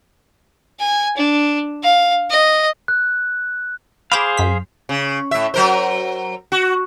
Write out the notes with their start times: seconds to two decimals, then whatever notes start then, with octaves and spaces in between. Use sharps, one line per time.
0.80 G#5
1.17 D4
1.83 F5
2.30 D#5
2.88 F#6
4.12 G#4 C5 F5 B5 D6 E7
4.37 F#2 B6
4.89 C#3
5.31 A2 E5
5.54 F#3 A#4 C5
6.52 F#4